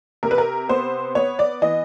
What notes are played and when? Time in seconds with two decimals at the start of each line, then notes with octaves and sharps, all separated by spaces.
0.23 C3 A#4
0.31 B4
0.38 A#4
0.69 B3 C5
1.15 B3 C#5
1.39 D5
1.62 E3 D#5